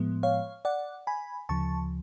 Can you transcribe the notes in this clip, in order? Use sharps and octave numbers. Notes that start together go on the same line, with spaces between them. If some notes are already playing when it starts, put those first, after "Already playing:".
Already playing: A2 F3 G#3 B3
C#5 F5
D5 F#5
G#5 B5
D2 C#3 F3 A5 C#6